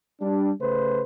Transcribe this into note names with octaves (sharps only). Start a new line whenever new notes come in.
G3 D4
C#3 A3 B4 C5